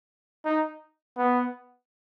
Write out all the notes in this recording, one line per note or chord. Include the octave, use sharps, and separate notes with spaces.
D#4
B3